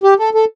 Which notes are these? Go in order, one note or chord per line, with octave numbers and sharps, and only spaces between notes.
G4
A4
A4